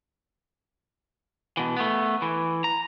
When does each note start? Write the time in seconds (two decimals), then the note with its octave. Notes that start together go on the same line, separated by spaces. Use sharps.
1.57 B2 E3
1.77 A3 B3
2.22 E3
2.64 A#5